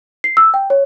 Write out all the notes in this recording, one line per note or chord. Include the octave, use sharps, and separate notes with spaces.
C7
E6
G5
C#5